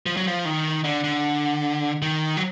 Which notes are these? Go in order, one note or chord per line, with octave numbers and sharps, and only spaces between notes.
F3
F#3
F3
D#3
D3
D3
D#3
F#3